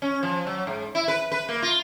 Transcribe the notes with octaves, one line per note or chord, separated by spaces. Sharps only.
C#4
F3
F#3
G#2
E4
B4
B4
A#3
F4